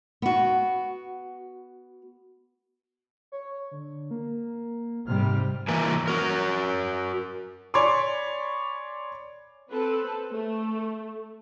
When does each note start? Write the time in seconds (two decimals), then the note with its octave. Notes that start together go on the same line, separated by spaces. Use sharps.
0.22 B3 F#4
3.32 C#5
3.71 D3
4.11 A#3
5.07 G#2 C3 G3 F6
5.68 E3 A#3 G#5
6.08 F#4 A#4
7.74 C#5 D5 G#5 B5 C6 D6
9.71 C4 A4 B4
10.31 A3